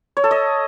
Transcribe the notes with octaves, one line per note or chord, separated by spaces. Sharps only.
C#5
A4
D#5